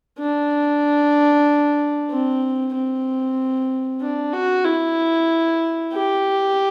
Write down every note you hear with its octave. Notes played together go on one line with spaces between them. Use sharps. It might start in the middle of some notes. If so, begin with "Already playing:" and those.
D4
C4
C4
D4
F#4
E4
G4